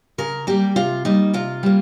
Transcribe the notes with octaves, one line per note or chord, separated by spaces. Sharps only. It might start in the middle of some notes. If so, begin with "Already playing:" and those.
C#3 A#4
G3 A#3 G4
C3 F4
G3 A#3 D#4
C3 F4
G3 A#3